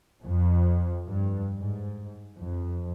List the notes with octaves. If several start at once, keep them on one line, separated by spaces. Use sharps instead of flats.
F2
G2
G#2
F2